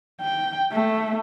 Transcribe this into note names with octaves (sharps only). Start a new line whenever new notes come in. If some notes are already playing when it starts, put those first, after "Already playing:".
G5
A3